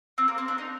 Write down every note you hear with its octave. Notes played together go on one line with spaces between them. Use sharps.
C4
A#3
C4
D4
D#4